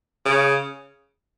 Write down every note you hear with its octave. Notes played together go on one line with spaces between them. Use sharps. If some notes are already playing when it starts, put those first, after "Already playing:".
C#3